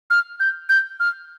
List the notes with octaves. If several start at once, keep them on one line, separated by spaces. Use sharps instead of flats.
F6
G6
G6
F6